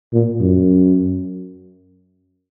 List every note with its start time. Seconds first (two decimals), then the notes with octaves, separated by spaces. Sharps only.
0.13 A#2
0.40 F#2